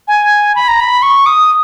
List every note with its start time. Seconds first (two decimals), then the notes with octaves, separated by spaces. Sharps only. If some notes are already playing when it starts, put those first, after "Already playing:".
0.08 G#5
0.55 B5
0.68 A#5
0.80 B5
1.02 C#6
1.26 D#6